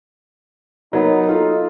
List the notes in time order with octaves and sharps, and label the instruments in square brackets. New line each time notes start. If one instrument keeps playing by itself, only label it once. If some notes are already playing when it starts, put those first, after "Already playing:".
[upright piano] F#3 A#3 B3 [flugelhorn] D#4
[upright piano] F4 A4